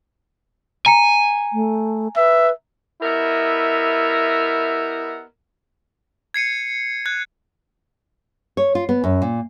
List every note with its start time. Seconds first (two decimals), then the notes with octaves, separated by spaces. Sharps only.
0.86 G#5 A#5 C#7
1.53 A3
2.17 B4 E5
3.02 B3 E4 G4 A#4 D#5 E5
6.34 G#6 C7 C#7 D#7
7.06 F#6 G#6
8.57 C#5
8.75 F4
8.89 B3
9.04 F#2
9.22 A#2